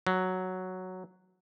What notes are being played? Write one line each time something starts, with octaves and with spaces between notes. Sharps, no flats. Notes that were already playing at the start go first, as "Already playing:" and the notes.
F#3